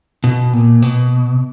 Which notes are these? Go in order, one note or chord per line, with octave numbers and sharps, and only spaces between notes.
B2
A#2
B2